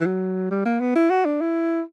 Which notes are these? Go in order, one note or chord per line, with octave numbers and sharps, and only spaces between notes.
E3
F#3
G3
A#3
B3
E4
F#4
D4
E4